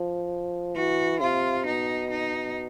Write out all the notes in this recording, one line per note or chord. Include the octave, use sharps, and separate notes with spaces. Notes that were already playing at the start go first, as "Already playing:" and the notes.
Already playing: F3
E3 F#4
C3 F4
B2 D#4
D#4